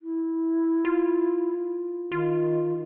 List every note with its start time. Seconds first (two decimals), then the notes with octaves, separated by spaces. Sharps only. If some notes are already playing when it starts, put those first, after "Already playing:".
0.01 E4
0.85 F4
2.12 D#3 F4